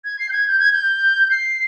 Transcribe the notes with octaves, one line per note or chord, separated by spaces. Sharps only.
G#6
C7
G6
G#6
G6
G#6
G6
C7